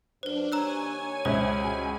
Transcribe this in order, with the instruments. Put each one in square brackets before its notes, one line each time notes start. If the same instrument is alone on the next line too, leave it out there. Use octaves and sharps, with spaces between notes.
[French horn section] F#2 [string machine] D4 [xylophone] B4 C5
[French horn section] D#2 G4 C#5 [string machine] G#5 [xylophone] A#5 E6 F#6
[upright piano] C#2 E5 [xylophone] C5
[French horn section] G#3 F#4